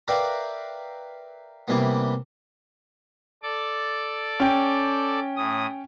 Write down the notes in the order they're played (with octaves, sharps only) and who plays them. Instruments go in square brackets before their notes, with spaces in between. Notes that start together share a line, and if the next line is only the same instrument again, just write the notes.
[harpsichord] A#4 B4 D5 E5 F5 G5
C3 E3 G3 A#3 B3
[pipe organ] A4 D5 D6
[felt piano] C#4 G5
[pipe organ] A2 D#6